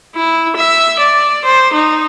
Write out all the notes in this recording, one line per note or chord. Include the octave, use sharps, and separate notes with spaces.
E4
E5
D5
C5
D#4